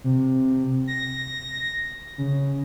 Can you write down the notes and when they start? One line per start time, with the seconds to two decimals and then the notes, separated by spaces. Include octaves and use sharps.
0.04 C3
0.87 A#6
2.18 C#3